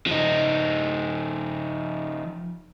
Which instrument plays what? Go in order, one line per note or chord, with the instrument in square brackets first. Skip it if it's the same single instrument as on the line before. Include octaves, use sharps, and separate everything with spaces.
[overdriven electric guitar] F3 D#4